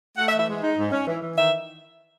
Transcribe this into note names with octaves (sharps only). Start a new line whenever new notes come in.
A3 F#5
E5
E3
E5
G#3
D#4
G#2
C#4
E3
E3
D#3 E5